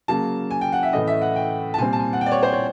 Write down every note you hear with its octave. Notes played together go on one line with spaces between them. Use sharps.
C#3 F#3 A#3 A5
G#5
G5
F#5
E5
A2 E3 A3 C#4 D#5
E5
F#5
G5
A5
A#2 G3 C4 G#5
A5
G#5
F#5
G5
D5
C#5
C5
C#5